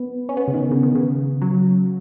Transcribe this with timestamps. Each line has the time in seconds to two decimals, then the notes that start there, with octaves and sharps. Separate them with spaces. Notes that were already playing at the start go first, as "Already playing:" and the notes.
Already playing: B3
0.29 C#4
0.37 B3
0.48 C#3
0.54 D#3
0.71 C#3
0.83 D#3
0.95 C#3
1.42 F#3